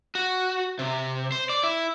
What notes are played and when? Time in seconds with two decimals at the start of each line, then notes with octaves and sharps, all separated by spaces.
0.15 F#4
0.79 C3
1.32 C5
1.49 D5
1.64 E4